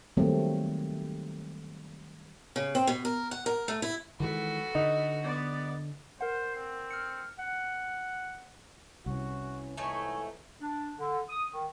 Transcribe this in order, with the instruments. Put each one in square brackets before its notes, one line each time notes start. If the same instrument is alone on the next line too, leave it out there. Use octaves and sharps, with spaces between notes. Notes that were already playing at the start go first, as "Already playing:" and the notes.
[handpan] D#3 F#3 G3 A3 A#3 C4
[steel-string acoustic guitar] C#3
C4
B2
A#4
F#5
A#4
A3
E4
[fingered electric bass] D#3 E3 G#3 [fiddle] F#4 [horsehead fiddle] A4 B4
[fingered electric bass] D3 [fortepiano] D#4
[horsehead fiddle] B3 D5
[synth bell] A#4 F#5 [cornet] C5
[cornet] C4
[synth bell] F6 C#7
[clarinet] F#5
[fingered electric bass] C2 [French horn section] E3 C#4 [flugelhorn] F#4
[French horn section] F2 G#2 E3 [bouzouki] A3 D#4 C#5 [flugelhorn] G#5
[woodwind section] D4
D3
D#6
D#3